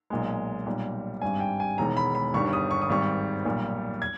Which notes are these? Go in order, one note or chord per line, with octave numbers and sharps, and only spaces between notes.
B1 A#2 G#3
B1 A#2 G3
G#1 G2 G3 G#5
G5
G#5
E1 E2 D#3 G#3 A#5
B5
B5
G1 G2 D#3 G3 C#6
D#6
C#6
D#6
G#1 G#2 D#3 G3 C#6
B1 A#2 G3
G#6